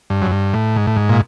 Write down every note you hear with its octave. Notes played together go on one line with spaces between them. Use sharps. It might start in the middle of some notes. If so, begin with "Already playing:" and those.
G2
F#2
G2
A2
G#2
A2
G#2
A#2